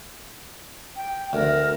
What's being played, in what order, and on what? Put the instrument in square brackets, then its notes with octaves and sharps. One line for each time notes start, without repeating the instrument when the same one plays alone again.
[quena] G5
[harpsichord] D2 [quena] A#4